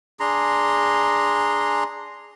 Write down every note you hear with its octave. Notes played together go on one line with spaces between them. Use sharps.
D4 G#4 A#5 C6